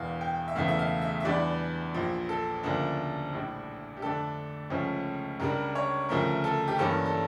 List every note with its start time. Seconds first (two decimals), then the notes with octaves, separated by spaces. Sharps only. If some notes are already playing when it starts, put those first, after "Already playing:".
Already playing: E1 E2 E3 F5
0.21 G5
0.48 E5
0.56 E1 E2 C#3 E3 A3 F5
0.68 E5
0.79 F5
1.02 E5
1.20 E5
1.25 E2 E3 G3 D4 D5
1.94 A#1 A#2 F3
2.29 A4
2.63 D2 C#3 F3 A#3 D4
3.33 A#1 A2 G3 D4
3.97 G4
4.02 F2 D3 A3 D4 A4
4.70 C#2 C#3 F3 A3 C#4
5.40 C#2 C#3 G3 D4 A#4
5.75 C#5
6.09 D2 C#3 F3 A3 A#4
6.44 A4
6.68 G4
6.78 G2 E3 G3 A#3 C#4 A4
7.06 A4